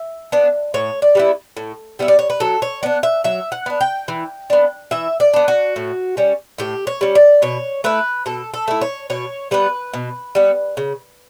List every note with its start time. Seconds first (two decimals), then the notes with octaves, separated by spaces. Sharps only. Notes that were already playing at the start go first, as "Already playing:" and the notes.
Already playing: E5
0.32 B3 D4
0.74 A2 C#5
1.02 D5
1.15 G3 B3 E4
1.57 A2
1.99 G3 B3 E4
2.08 D5
2.19 C#5
2.30 B4
2.40 F#3 A4
2.62 C#5
2.83 B3 D4 D5
3.03 E5
3.24 F#3 E5
3.52 F#5
3.66 B3 D4
3.81 G5
4.08 E3
4.50 B3 D4
4.91 E3 E5
5.20 D5
5.34 B3 D4
5.48 F#4
5.76 A2
6.17 G3 C#4
6.58 A2 G4
6.87 C#5
7.01 G3 C#4
7.15 D5
7.42 B2 C#5
7.84 A3 E4 B4
8.26 B2 A4
8.54 A4
8.68 A3 E4
8.81 C#5
9.10 B2 C#5
9.51 G3 B3 B4
9.94 B2
10.35 G3 B3
10.77 C#3